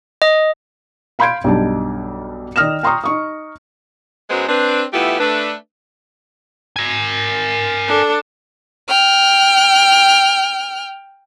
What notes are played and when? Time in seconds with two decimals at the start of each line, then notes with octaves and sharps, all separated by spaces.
0.22 D#5
1.19 F5 B5 C6 G6 G#6 D7
1.44 B1 G2 D4 D#4 A5
2.56 D#3 D5 D#6 F6 A#6 E7
2.83 G5 A#5 C6 C#6 D#6
3.04 D#4 C#6 D#6
4.30 F#2 F#3 G#3 B3 C5
4.49 C4 D4 B4
4.94 E3 A3 B3 E4 F4 G4
5.20 A3 D4 B4
6.76 A#4 G#5
7.88 D4 A4
8.89 G5 F6